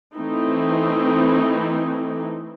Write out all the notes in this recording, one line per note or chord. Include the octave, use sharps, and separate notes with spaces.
E3 A3 C4 D#4 E4